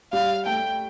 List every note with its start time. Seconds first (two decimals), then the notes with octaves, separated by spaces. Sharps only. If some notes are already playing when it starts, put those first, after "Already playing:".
0.13 G3 F5
0.46 A3 G5